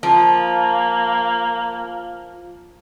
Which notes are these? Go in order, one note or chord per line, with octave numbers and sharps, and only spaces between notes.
F3 A#3